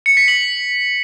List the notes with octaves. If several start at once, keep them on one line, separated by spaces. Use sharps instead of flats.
C#7
B6
F#7